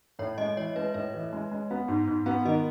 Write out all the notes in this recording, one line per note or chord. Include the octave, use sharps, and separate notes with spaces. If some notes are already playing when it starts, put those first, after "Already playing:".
A2 C#5
G#3 D#5
E3 C#5
G#3 B4
A2 B4
E3
G#3
G#3
B3
G#2
G#2
B3
D#3 D#5